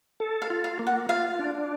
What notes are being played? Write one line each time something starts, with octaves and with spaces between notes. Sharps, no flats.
A4
F5
F4
F5
A#3
F#5
F4 F5
D4